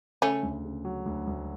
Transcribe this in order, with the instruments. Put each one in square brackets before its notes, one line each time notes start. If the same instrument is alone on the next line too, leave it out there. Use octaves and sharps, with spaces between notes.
[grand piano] C#3 [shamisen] A3 C#4
[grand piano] D2
C#3
F#3
D2
D2